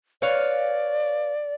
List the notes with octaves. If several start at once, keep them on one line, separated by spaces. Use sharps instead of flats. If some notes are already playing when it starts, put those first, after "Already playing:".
B4 C#5 D5 F5